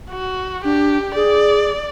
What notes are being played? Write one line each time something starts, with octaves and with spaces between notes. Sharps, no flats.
F#4
D4 G4
G#4 D5